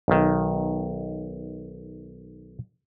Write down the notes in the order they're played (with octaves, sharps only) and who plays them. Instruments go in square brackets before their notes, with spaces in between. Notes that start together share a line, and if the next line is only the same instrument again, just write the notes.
[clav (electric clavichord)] B1 D#3